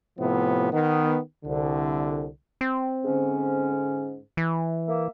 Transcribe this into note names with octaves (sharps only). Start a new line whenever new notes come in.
A2 C3 F3 B3
D#3 B3
C2 D3
C4
G#2 D3 C#4
E3
A#3 E5